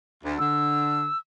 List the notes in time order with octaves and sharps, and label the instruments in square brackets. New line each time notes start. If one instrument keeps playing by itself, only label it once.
[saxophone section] D2
[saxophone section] D3 [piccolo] E6